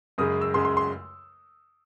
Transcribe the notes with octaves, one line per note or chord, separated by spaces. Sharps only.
F#2 C#3 G#3 D#6
E6
F#2 C#3 G#3 C6
C6
C6